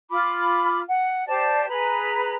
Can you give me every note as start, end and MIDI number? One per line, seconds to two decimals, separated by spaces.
0.10 0.80 65
0.10 0.80 83
0.10 0.80 86
0.88 1.27 78
1.27 1.65 67
1.27 1.65 72
1.27 1.65 74
1.27 1.65 81
1.69 2.36 68
1.69 2.36 71
1.69 2.36 82
1.69 2.36 83